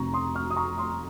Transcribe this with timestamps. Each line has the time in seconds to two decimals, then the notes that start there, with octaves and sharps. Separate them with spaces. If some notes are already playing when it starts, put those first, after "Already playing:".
Already playing: F1 F2 C3 A#5 C#6
0.14 C6 D#6
0.35 C#6 F6
0.51 D#6
0.56 A#5 C#6
0.78 C6 D#6